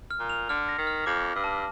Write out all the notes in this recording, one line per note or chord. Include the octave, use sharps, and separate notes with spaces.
F6
A#2
F7
D3 F6
A#6
D#3
F6
F2 D6
D6
G2
A5